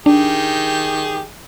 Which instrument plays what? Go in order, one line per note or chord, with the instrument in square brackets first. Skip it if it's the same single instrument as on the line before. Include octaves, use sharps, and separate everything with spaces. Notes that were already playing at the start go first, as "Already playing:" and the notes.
[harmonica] D#3 G4 G#4 [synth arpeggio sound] D4